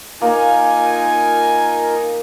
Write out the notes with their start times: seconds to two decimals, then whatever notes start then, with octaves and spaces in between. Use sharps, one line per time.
0.22 A#3 D#4 F4 A#4 G#5